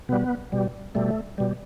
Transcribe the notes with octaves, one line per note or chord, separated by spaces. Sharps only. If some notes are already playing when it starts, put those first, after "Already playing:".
B2 G3 B3
B2 G3
B2 G3 A3
B2 G3